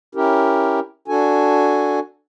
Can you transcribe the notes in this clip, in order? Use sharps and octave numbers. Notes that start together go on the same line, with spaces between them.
C#4 E4 G4 A#4
D4 F#4 A4 G#5